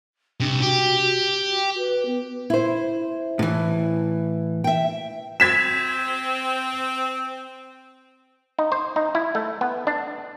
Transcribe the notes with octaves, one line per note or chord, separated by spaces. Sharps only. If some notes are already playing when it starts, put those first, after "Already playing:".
C2 C3 D4
F#4 G4
F#4
B4
B3
E4 C5
A2 E3
E5 G5
C4 G#6 B6 E7
D#4
C5
D#4
E4
A3
B3
D4